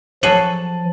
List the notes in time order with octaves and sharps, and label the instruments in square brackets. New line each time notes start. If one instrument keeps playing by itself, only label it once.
[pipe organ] F3 [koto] F#3 G#4 A4 [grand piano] A5 D#7 F#7